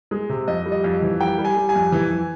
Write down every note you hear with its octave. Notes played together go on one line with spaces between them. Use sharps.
G#3
C3
F2 D#5
G3
D#5
F2
E3
G3 G5
G3
G#5
G3
G#5
F2
E3
E3